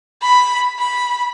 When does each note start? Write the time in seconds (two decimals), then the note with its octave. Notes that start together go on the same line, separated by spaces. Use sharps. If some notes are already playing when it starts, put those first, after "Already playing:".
0.22 B5
0.79 B5